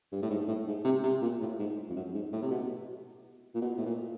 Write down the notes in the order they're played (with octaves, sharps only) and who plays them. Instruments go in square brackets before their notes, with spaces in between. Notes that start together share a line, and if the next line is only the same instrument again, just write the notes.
[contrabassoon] G2
A2
G#2
A2
G#2
C3
C3
A#2
A2
G#2
F2
F#2
G#2
A2
C3
B2
A#2
B2
A2
A#2